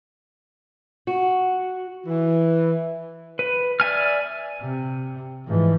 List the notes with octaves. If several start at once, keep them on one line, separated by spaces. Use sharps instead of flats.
F#4
E3
B4
D5 E5 G#5 F6
C3
G#2 E3 F3